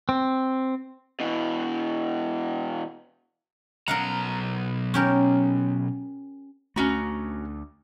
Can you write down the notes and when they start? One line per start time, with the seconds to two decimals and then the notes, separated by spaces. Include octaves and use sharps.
0.09 C4
1.20 B2 E3
3.88 B1 A#4 F5 F#5 A#5
4.94 C#4 G4 A#4
6.76 D2 A3 C#4 F#4 A#5